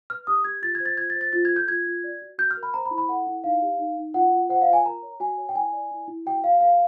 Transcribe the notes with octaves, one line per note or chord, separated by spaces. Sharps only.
B4 F6
G4 D#6
G4 G#6
F4 A6
G#6
C5
A6
F4 G#6
A6
C5
A6
F4 A6
G#6
A4
G6
F4 G#6
F4
D5
F#4
F#4 G6
F6
A#4
B5
C5 A#5
B5
E4
B5
A4 F#5
E4
D#4 F5
G4
D#4
D#4
F4 F#5
F4
C5 F#5
F5
F4
G#5
A#4 A#5
C#5
F#4 G#5
C#5
G5
E4 G#5
D5
E4
E4
F#4 G5
F#4 F5
A#4 F5